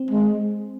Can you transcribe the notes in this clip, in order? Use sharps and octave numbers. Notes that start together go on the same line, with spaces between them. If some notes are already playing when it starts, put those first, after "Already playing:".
Already playing: C4
G#3